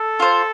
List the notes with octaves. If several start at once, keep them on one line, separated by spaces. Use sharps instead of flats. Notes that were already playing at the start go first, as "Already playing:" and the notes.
Already playing: A4
F4 C5